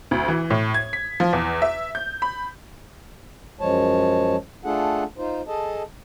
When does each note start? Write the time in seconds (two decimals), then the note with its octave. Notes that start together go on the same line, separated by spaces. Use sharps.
0.11 D2
0.28 E3
0.50 A2
0.74 G#6
0.93 B6
1.20 F3
1.33 E2
1.62 E5
1.95 G6
2.22 B5
3.61 F#2 F3 G#3 C#5 A5
4.65 A3 D4 F4 G#4 A4 F#5
5.18 D#4 F4 C5
5.48 G#4 A4 D#5 A5